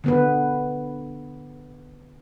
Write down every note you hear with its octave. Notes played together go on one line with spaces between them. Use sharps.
D3 B3 B4